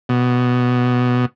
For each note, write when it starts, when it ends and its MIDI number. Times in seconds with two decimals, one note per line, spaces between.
0.09 1.26 47